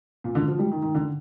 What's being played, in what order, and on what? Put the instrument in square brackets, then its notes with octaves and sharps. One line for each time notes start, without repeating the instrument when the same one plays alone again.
[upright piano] A#2
D3
F3
G3
D#3
D#3
D3